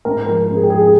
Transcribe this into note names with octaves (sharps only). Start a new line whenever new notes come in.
G#2 A#4
F3 A#4
G#2 A#4
G#4
G4
F3 G#4
G#4